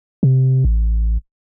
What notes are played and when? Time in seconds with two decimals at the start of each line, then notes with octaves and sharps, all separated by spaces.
0.23 C3
0.65 A1